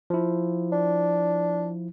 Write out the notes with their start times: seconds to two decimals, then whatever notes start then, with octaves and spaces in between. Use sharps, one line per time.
0.10 F3 E4
0.72 D4